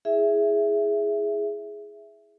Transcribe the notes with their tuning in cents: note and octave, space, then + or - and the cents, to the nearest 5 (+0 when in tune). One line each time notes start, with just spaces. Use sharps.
E4 -10 G#4 +0 E5 +0